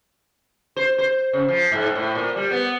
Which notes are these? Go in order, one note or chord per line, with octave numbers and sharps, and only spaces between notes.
C5
C5
C#3
F3
G#2
A2
A#2
G3
B3